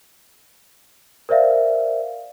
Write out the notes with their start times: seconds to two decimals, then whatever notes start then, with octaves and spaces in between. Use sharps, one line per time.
1.29 A#4 C5 D5 E5 F5